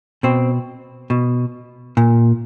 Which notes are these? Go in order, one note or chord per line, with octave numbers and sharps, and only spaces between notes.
B2 C4
B2
A#2